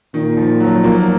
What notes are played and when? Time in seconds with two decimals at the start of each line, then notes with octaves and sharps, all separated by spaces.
0.14 A#2 D#3
0.37 F3
0.60 F#3
0.84 F3 A#3